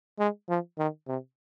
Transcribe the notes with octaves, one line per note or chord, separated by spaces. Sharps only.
G#3
F3
D#3
C3